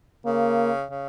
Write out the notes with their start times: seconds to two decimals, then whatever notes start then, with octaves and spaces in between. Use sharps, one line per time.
0.25 C#3 A#3
0.91 C#3